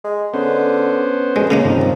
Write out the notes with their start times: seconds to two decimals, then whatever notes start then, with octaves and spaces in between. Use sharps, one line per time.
0.04 G#3
0.34 D3 B3 C#4 C5
1.36 D2 G#3
1.51 C#3 G#3 A#3 C#4
1.65 G2 C3 D#3 F3